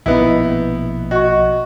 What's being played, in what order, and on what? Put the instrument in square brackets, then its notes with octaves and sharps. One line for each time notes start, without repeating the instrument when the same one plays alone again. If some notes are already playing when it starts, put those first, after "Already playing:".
[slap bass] A#1 B2 [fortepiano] B3 D#4 E4
[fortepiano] F#4 [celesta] D#5 C#6